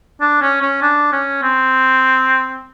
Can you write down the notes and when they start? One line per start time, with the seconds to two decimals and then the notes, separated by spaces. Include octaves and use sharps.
0.21 D4
0.41 C#4
0.62 C#4
0.82 D4
1.12 C#4
1.42 C4